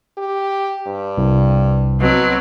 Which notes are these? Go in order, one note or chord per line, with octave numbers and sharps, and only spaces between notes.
G4
G2
C2
B2 F#3 C4